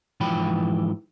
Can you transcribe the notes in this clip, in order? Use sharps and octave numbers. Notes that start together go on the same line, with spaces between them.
G#2 E3 F3 B4 G5 B5